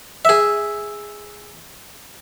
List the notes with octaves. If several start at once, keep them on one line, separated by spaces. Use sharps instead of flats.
G#4 E5